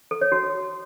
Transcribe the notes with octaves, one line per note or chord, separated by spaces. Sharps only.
A4
C#5
F#4